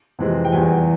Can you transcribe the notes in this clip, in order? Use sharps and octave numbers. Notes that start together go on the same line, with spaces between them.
F2 C3 E3 G#3
G5
E2 E3 G3 G#5